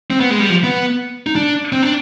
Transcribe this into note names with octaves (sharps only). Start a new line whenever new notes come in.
C4
B3
G#3
G3
F3
B3
D#4
D4
C4
D4